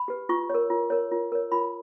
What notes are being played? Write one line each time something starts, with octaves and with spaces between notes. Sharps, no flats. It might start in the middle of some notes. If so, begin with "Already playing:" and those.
Already playing: B5
G4 B4
F4 C#6
A#4 C#5
F4
A#4 C#5
F4
A#4 C#5
F4 B5